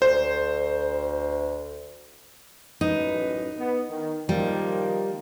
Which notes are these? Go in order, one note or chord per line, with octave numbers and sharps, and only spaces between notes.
D2 C5
A1 F#2 D#4 B4
B3
D#3
D#3 F3 G3 A#3